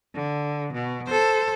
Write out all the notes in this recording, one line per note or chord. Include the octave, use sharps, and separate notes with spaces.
D3
B2
A4 C5